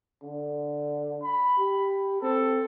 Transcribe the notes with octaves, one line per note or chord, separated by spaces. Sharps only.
D3
B5
G4
C4 A4